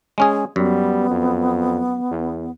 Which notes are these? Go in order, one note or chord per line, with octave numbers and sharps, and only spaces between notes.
G#3 C#4 G#4
F#2 G3 B3
F2
E2